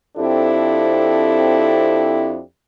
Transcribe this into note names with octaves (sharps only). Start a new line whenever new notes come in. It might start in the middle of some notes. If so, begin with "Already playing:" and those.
F2 C4 D4 E4 G4 A4